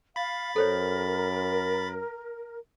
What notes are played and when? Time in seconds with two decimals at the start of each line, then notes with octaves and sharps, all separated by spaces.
0.16 F5 B5 A6
0.56 F#2 A4 A#4 C5 C#5